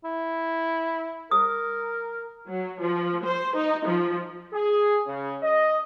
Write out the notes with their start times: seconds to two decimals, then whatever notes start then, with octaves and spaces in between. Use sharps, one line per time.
0.05 E4
1.31 A#4 D#6
2.48 F#3
2.81 F3
3.26 C5
3.56 D#4
3.88 F3
4.53 G#4
5.06 C#3
5.42 D#5